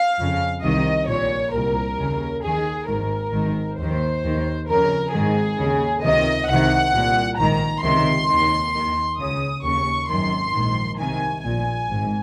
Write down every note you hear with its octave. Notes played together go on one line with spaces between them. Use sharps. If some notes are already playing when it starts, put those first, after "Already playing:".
Already playing: F5
F2 C#3
C2 C3 D#3 D#5
A#1 A#2 C#5
C2 A#2 A#4
D#2 C#3
D#2 D#3 G#4
G#1 G#2 D#3 A#4
G#1 G#2 D#3
D#2 D#3 C5
D#2 D#3
F2 C#3 A#4
G#1 G#2 D#3 G#4
D#2 C#3
C#2 C3 D#3 D#5
C2 C3 D#3 F#5
C2 A#2
A#1 G#2 D#3 A#5
C#2 C3 D#3 C6
D#2 D#3
D#2 D#3
C#2 C#3 D#6
D#2 C#3 C#6
G#1 F#2 D#3 C6
A#1 G#2 D#3
C2 C3 D#3 G#5
A#1 A#2 G#5
G#1 G#2